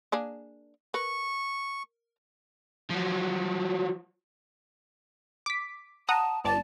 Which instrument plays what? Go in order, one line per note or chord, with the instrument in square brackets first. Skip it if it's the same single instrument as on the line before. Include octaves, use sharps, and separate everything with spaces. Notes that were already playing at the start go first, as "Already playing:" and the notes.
[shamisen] A#3 D4 G#4
[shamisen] A#4 B4 [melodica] C#6
[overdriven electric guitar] F3 F#3
[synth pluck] D6 B6
[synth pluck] F#5 A#5 D#6 [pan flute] A5
[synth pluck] G1 D5 A6 [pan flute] A5